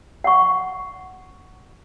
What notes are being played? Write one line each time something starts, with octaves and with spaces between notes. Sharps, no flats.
F#5 C#6